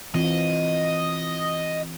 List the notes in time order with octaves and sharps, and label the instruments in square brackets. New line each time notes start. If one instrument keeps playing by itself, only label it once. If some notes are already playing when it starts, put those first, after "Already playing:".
[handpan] E3 C4 F4 [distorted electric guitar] D#5